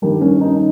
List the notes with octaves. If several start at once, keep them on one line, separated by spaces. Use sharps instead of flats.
G2 D#3 G3 G4 A#4
C#4
D#4